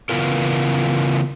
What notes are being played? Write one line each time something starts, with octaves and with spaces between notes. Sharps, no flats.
C#3 E3 B3 F4 A#4